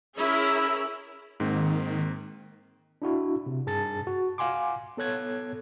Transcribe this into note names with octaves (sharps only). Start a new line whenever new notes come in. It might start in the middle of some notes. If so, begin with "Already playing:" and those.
C#4 E4 G#4 A#4
G#2 D#3 A#3 C4
D4 E4 F#4
C3
G2 G#4 A5 A6
F#4
F5 F#5 G#5 C6 D6
B3 A4 C#5 F#6 G#6